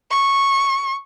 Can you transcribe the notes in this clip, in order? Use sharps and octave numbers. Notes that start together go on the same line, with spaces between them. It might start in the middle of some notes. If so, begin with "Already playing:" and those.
C#6